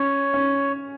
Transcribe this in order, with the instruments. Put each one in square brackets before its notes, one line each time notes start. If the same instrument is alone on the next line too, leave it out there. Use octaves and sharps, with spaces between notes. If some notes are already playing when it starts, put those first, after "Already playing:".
Already playing: [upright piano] C#4 [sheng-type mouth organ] C#5
[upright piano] C#4